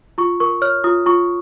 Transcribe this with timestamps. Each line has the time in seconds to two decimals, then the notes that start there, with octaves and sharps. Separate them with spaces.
0.18 F4 C#6
0.40 A#4 C#6
0.62 C#5 F6
0.84 F4 D#6
1.06 F4 C#6